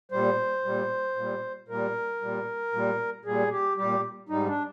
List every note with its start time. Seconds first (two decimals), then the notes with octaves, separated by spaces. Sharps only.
0.12 A#2 G3 C5
0.65 A#2 G3
1.16 A#2 G3
1.68 A#2 G3 A#4
2.21 A#2 G3
2.72 A#2 G3
3.25 A#2 G3 G#4
3.51 G4
3.77 A#2 G3 G4
4.29 G#2 G3 D#4
4.47 D4